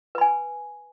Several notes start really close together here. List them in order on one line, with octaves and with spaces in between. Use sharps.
B4 B5 G#5